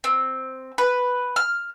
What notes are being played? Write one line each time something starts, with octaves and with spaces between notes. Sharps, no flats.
C4
B4
F6